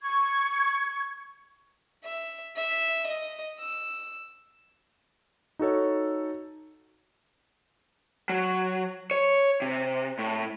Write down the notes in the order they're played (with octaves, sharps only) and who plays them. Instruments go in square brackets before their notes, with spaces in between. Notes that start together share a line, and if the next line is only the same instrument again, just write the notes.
[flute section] C#6 G#6
[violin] E5
E5
D#5
E6
[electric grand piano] D#4 F#4 A4 C#5
[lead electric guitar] F#3
C#5
C3
A2